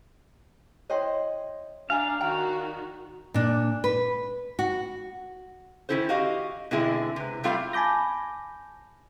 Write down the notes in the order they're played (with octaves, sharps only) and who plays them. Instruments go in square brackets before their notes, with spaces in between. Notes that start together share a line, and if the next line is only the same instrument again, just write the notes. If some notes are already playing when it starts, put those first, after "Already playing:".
[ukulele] E4 C5 D#5 [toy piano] C#5 G5 C6
[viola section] D4 [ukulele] E5 G#5 A#5 [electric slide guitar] F5
[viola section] D#3 F#4 [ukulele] D5 G5 A#5
[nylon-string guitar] A#2 D4
B4
F#4
[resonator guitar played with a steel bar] D#3 F3 C#4 E4 A4 C5
F#4 G4 D#5 F5
B2 D3 G#3 C4 E4 G#4
C3 B4
F#3 G3 A3 C4 F4 F5
[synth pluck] G#5 A5 B5 D6 G6 A#6